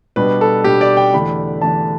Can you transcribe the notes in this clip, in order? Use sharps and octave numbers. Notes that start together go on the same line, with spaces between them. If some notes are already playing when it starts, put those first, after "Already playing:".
B2 G3 D4 B4
A4
B2 G3 D4 G4
D5
G5
E2 D3 A3 D4 B5
E2 D3 A3 D4 A5